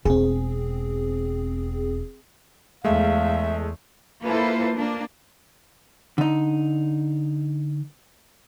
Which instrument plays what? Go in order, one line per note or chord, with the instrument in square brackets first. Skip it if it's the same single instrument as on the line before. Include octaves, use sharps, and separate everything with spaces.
[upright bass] E1 [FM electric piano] C4 G#4
[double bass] E2 [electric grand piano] G#3 A3 [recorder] E5 [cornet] F5
[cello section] A#3 E4 F4 A4 B4 C5
A#3 D4
[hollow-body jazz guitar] D3 D#4